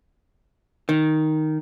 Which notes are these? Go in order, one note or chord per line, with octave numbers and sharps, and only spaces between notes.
D#3